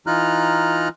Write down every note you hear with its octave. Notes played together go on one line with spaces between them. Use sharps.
E3 D#4 F4 A#5 F6 F#6